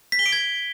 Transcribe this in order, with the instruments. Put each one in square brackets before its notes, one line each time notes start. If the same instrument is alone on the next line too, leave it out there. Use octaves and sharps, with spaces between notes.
[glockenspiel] B6
G7
D7
G#6